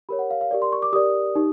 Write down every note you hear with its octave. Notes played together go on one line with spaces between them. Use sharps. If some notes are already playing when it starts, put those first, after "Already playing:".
G4 A#4 C#5 B5
F#5
F5
F5
G4 A#4 D5
C6
C#6
D6
G4 A#4 D5 D#6
D#4 G4